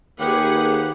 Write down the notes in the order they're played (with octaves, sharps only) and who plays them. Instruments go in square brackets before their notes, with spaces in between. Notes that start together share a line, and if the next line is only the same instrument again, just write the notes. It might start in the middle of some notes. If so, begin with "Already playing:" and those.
[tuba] D#2 [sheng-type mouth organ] G4 [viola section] G#4 B4 F#5